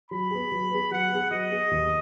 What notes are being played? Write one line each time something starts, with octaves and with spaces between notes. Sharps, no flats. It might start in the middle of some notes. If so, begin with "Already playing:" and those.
F#3 B5
B3 G#4
F#3
B3 G#4
F#3 F#5
B3 G#4
F#3 D#5
B3 G#4
D#2